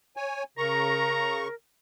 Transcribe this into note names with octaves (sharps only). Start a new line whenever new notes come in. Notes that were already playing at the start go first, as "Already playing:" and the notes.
C#5 G#5
C#3 A#4 A#5 C#6